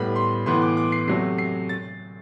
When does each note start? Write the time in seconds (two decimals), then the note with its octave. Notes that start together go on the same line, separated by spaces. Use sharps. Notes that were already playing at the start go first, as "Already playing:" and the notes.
Already playing: A2 G3 B3 B5
0.16 C6
0.46 A2 E3 B3 C6
0.62 D6
0.77 D6
0.92 C7
1.07 C3 F#3 A3 C7
1.38 C7
1.69 A6